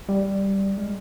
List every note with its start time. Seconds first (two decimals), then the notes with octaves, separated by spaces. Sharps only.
0.09 G3
0.78 G#3